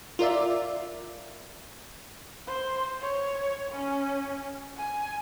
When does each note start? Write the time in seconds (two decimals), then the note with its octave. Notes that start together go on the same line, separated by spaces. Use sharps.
0.19 F4 A#4 D5 E5
2.47 C5
3.00 C#5
3.71 C#4
4.76 G#5